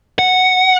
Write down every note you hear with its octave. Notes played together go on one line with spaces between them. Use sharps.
F#5